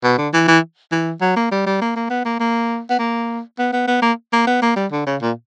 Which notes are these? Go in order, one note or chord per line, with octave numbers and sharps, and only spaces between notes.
B2
D3
E3
E3
E3
F#3
A#3
G3
G3
A#3
A#3
B3
A#3
A#3
B3
A#3
B3
B3
B3
A#3
A#3
B3
A#3
G3
D3
C#3
A#2